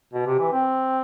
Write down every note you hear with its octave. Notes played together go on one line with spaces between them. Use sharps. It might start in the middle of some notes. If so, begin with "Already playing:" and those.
B2
C3
E3
C4